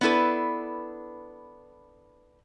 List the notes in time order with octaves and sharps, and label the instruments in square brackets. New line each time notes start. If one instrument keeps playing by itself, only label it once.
[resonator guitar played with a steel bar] B3 D4 E4 A4 B4